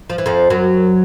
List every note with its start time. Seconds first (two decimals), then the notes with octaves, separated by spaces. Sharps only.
0.10 F3
0.18 E3
0.26 F2 F3
0.50 F#2 F#3